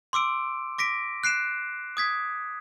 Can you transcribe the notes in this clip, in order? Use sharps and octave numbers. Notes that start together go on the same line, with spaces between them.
C6 D6 E6 D7
D6 A#6 B6 D7
F#6 C7 D7 E7
D#6 G#6 B6